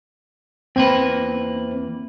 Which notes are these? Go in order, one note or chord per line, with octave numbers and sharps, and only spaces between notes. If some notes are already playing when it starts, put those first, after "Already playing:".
E2 A#3 C4 B4